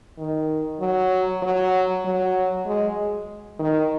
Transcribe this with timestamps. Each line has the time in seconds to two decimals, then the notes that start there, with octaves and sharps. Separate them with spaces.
0.18 D#3
0.81 F#3
1.43 F#3
2.05 F#3
2.66 G#3
3.59 D#3